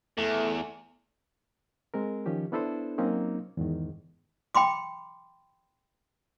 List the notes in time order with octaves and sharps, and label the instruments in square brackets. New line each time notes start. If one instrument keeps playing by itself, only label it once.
[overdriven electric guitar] E2 [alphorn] A3
[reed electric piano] G#3 C4 A#4
D#3 F3 C#4 G4
B3 D4 E4 A4 B4 C5
F#3 A#3 C4 C#4 D#4
E2 G#2 D#3
[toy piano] G5 B5 C6 D6